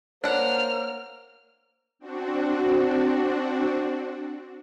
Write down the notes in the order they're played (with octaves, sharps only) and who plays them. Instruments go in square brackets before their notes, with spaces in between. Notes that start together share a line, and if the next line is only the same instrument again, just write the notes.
[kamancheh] A#3 F6 [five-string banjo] D4 F#5 [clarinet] C5 [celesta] C#5
[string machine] C4 D4 F#4